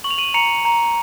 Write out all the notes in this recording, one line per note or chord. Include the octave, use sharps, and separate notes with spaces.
C#6 F#7
F7
D#7 F#7
A#5 C#7 F7
A#5